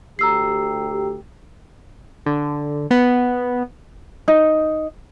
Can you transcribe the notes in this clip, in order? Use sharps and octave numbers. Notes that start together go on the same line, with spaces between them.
D2 G4 A#5 E6 C7
D3
B3
D#4